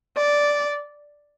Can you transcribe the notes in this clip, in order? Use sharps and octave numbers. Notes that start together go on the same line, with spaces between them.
D5